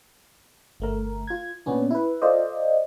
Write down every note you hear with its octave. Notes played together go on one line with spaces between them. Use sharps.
G1 A3 A#4
F4 G#6
A#2 B3 C#4 D4
E4 B4
F4 A4 C5 D5 D#5